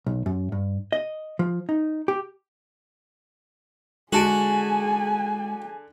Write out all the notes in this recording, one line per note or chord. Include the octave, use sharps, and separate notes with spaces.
B1
F#2
G2
D#5
F3
D#4
G4
D3 G#3 F#4 G#4 G#5 A5 D7